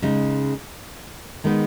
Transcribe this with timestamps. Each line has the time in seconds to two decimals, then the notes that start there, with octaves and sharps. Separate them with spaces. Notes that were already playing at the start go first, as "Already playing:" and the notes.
0.02 C#3 G#3 D#4
1.44 D#3 G#3 B3 D#4